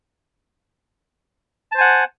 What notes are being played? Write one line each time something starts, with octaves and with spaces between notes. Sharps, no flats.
C5 F#5 G#5 A5